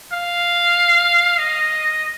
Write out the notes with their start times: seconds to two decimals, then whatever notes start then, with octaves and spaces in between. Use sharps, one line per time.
0.12 F5
1.39 D#5